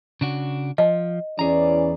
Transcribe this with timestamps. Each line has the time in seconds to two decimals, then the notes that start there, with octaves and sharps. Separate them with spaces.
0.21 C#3 D4 F#4
0.78 F3 D#5
1.39 E2 E3 C#4 G#4 D5 A#5